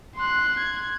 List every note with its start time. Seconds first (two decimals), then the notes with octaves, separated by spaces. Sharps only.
0.16 C6 F#6
0.60 G#6